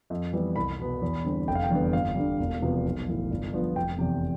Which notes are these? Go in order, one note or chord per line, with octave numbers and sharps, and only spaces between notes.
F2
E3 G3 B3
C2 B5
B2 B3
E2
D3 G3 C4
F1 G5
F5
G5
E2 D3 G3 B3
G1 F5
G2 D3 G3
E1
E2 C3 F3 B3
B1
A2 E3
G1
G2 F3 B3
F1 G5
E2 C3